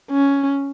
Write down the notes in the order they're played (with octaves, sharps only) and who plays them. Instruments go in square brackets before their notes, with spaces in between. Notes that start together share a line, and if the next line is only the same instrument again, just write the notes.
[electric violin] C#4